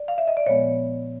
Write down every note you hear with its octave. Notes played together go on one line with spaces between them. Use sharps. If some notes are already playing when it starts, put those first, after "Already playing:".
Already playing: D5
F5
E5
D#5
D5
A#2 F3 G#3 B3 C#5